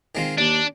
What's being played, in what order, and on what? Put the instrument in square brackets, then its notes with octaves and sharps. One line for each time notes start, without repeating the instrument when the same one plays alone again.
[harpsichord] D#3 G#3 C4 F4
[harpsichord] D#2 [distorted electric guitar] D4